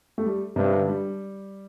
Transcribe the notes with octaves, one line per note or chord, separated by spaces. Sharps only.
A3
G3
G2 C3
D3
G3